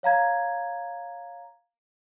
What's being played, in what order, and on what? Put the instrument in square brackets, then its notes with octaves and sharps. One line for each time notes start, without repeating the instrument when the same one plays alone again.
[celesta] C#5 F5 A#5 G#6